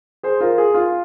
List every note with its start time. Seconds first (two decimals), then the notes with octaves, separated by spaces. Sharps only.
0.23 G#4 C5
0.41 F4 A#4
0.58 G#4
0.74 F4